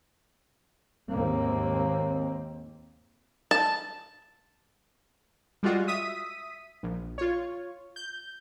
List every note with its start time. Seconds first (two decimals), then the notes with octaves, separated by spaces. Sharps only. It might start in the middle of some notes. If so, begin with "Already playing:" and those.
1.10 D#2 G#2 A#3 C4
3.51 A5
5.63 G3 G#3 F4 F#4
5.88 E5 D#6 B6 D#7
6.83 A#1
7.18 F4 C#5
7.96 G6